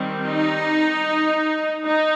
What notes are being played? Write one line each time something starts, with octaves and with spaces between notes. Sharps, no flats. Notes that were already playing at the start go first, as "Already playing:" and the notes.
Already playing: D#3 G3 C4
D#4
D#4